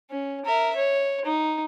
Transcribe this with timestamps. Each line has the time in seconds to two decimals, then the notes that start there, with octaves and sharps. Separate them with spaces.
0.10 C#4
0.45 A#4 E5
0.76 C#5
1.25 D#4